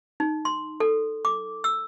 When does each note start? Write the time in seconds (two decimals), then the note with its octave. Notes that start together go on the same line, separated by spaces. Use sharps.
0.20 D#4
0.45 C6
0.80 A4
1.25 D6
1.64 E6